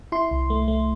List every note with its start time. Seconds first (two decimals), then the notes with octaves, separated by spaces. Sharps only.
0.12 E4 C6
0.31 C2
0.50 A3
0.68 A3